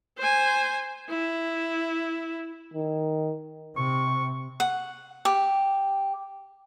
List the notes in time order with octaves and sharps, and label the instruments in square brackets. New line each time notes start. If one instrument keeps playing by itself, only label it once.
[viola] C5 G#5
E4
[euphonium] D#3
[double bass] C3 [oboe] C#6
[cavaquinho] F#5
G4